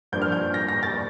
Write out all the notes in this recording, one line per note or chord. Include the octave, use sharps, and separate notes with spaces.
G2 F3 A#3 D4 G6
F6
G6
A#6
A#6
A6